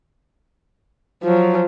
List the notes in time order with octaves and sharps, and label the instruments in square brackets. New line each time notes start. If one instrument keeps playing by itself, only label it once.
[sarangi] F3 [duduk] F#3